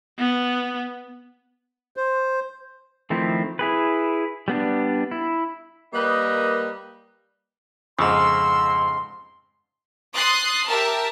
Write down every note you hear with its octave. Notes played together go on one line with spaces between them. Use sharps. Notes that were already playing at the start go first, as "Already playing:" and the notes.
B3
C5
D#3 F3 A3 C4 E4
E4 G#4 B4
G3 B3 D4
E4
G3 A#3 A#4 B4 D#5
F2 G#2 C#3 C6 E6
C6 D#6 F#6 A6 C7
G4 A#4 E5 A5